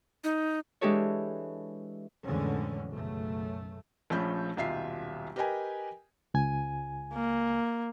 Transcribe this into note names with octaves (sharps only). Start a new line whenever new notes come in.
D#4
E3 G#3 D4 G4 A4 C#5
F2 A2 D3 E3 G#3 C#4
B1 F#2 C#3 A3
A#1 F3 A3 C#4 B5 G6
D#1 B1 F4 E5 C7
G4 A#4 B4 D#5 G5 G#5
C#2 G#5
A#3